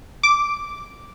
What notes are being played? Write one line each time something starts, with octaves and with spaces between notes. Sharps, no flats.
D6